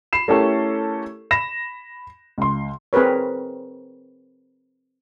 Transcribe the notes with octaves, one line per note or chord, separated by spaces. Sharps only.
B5 C7 E7
A3 C#4 E4 G4 A4 A#4
B5 A#6 E7
C#2 C6
C4 G#4 A#4 B4 C#5